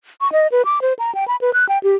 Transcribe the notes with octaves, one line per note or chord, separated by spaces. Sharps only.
C#6
D#5
B4
D6
C5
A#5
G5
B5
B4
F#6
G5
G4